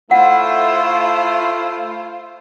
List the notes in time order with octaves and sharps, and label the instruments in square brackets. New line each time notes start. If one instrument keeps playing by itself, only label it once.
[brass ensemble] A3 [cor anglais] E4 [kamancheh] F4 C5 [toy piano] F#5